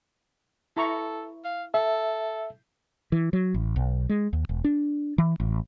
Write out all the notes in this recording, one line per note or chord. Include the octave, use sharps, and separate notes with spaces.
E4 A4 A#5 C#6
F5
A4 E5
E3
F#3
A1
B1
G#3
D#2
E1
D4
E3
A1